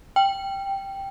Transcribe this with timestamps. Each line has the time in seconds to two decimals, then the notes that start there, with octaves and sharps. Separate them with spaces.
0.16 G5